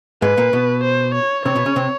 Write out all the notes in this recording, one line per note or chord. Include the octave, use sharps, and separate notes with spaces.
G#2 G#3 B4
A#2 A#3
B2 B3
C5
C#5
C3 C4 C#5
B2 B3
C#3 C#4
C3 C4